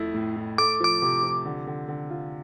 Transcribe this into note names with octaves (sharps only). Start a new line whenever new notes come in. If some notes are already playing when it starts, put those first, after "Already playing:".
Already playing: F2 A3 E4
A2
A2
A3 D6
F3 D6
C3
F3
D3
D3
D3
F4